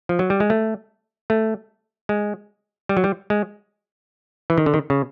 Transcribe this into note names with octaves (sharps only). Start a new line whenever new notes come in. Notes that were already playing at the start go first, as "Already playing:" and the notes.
F3
F#3
G3
G#3
A3
A3
G#3
G3
F#3
G3
G#3
E3
D#3
D3
D#3
C#3